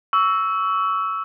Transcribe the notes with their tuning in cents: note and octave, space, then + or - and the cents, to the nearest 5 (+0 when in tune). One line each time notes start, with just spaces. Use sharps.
C#6 +25 E6 +0